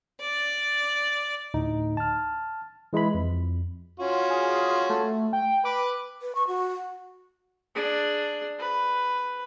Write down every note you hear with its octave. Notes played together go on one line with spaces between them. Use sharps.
D5
D2 A2 D#4
A5 F6
E3 G#3 E4 B4 B5
F2
C#4 F4 F#4
G#4
A3
G5
B4 D6
B4
C#6
F#4
D4 G#4
B4